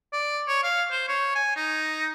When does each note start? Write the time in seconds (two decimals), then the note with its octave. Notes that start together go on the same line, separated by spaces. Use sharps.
0.13 D5
0.48 C#5
0.63 F5
0.91 C5
1.08 C#5
1.35 G#5
1.56 D#4